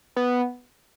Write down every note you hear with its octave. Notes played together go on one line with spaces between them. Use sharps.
B3